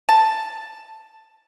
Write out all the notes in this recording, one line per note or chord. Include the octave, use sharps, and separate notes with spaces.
A5